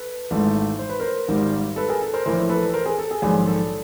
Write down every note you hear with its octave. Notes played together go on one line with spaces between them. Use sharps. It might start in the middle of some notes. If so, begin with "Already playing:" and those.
Already playing: A4 B4
G#1 G#2 E3 A3
C5
B4
A#4 C5
G#1 G#2 D#3 G3
A4 B4
G#4 A#4
A4
A#4 C5
A#1 A2 E3 A#4 C5
A4 B4
A#4 C5
G#4 A#4
A4
G#4
A#1 G#2 D#3 F#3 G#4
A4